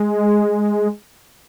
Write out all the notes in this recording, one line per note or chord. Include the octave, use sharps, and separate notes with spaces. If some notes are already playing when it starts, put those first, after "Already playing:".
Already playing: G#3